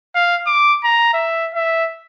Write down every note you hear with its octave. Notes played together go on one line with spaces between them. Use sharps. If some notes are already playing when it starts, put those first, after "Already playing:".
F5
D6
A#5
E5
E5